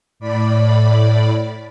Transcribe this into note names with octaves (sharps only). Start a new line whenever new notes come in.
A2 D5 B5